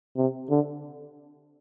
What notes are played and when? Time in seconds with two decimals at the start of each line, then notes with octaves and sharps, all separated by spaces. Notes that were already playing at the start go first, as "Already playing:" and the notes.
0.17 C3
0.50 D3